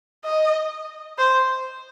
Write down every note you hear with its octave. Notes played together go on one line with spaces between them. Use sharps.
D#5
C5